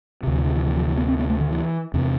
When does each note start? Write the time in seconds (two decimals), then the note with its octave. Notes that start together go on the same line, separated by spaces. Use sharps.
0.23 D2 C3
0.34 E3
0.45 D3
0.55 E3
0.66 E3
0.76 F3
0.87 E3
0.98 B3
1.09 C4
1.19 B3
1.30 A3
1.41 D3
1.51 E3
1.94 E2 C3